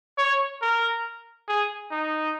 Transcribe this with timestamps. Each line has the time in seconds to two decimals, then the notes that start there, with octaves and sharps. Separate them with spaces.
0.18 C#5
0.62 A#4
1.48 G#4
1.92 D#4